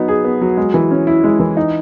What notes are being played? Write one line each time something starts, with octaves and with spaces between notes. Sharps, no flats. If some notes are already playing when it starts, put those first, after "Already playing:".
Already playing: F#3 B3 D#4
G#4
B3
F#3
G#3
E3
C#4
E4
G#3
E3
D#4